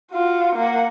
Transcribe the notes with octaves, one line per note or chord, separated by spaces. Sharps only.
F4 F#4
A#3 F#5